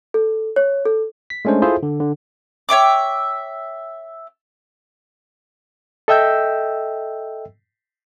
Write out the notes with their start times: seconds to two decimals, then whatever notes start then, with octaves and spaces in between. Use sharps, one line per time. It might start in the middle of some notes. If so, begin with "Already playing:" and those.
0.14 A4
0.56 C#5
0.86 A4
1.30 B6
1.45 G#3 A3 C#4 D4 C5
1.62 E4 F4 G#4 A4 C5 E5
1.83 D3
2.00 D3
2.69 C#5 E5 G5 D6
6.08 A4 D#5 E5 G5 E6 G6